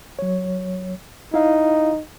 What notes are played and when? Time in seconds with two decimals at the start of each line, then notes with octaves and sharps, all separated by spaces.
0.19 F#3 C#5
1.34 D#4 E4 F5